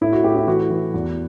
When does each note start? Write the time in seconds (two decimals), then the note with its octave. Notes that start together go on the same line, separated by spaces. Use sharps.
0.01 A2 E4
0.13 F#4
0.24 A2 G4
0.36 E4
0.47 E3 F#4
0.70 E3
0.94 E2